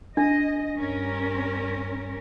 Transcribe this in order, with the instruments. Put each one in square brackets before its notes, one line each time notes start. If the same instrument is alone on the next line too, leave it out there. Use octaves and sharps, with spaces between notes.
[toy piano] D4 [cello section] D#5
[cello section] G2 C#4 A#4